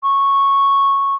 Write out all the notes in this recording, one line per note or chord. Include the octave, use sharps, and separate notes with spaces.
C#6